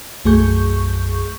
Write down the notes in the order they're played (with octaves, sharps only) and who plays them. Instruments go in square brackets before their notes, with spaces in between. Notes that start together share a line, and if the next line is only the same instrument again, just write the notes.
[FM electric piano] B1 F#2 A3 G#4 C#6 G6